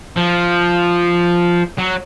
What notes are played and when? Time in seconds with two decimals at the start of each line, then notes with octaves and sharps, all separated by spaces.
0.17 F3
1.78 F#3